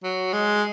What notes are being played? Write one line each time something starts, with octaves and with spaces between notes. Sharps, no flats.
F#3
G#3